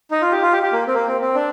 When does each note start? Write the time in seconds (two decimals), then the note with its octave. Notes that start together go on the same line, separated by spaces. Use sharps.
0.11 D#4
0.22 F4
0.32 G4
0.42 F4
0.53 G4
0.63 G4
0.73 A#3
0.87 C4
0.94 A#3
1.07 C4
1.21 C4
1.35 D4